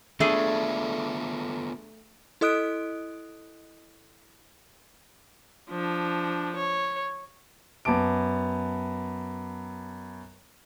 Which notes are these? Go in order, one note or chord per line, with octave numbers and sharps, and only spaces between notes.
A3 B3 D4 F4 G#4 A4
E4 A4 D#5 D#6 F#6 D7
F3 D4
C#5
F#2 B3 A5 D6 D7